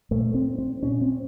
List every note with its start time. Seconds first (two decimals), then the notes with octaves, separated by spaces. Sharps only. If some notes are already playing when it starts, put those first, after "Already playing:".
0.11 A#2 A3
0.34 C4
0.58 C4
0.83 A#2 C#4
1.01 C4